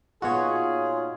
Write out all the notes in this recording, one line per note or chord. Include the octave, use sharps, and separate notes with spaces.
A#2 B3 D#4 F4 F#4 G#4 C#5